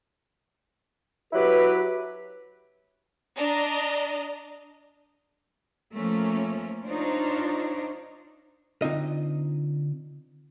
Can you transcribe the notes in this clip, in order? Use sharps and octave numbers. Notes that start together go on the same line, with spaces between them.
F#3 E4 G4 B4
D4 D#5 A#5
F3 A3 A#3 C#4
D4 D#4 F4 C5 C#5
D3 C4 D#4 F4 D#5